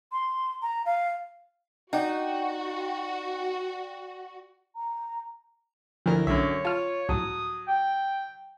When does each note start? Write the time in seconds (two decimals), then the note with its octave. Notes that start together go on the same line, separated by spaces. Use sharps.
0.12 C6
0.62 A#5
0.86 F5
1.93 D#4 F#4 D5 F#5 G5
4.76 A#5
6.06 D2 F3 E4 A#4
6.27 B1 F#2 D3 C#5 E5
6.65 F4 A5 F6
7.09 C#2 A2 F#3 A5 D#6
7.67 G5